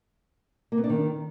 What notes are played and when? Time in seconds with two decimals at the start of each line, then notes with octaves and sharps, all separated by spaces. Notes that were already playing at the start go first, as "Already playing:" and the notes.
0.72 A#3
0.78 B3
0.84 D4
0.89 D#3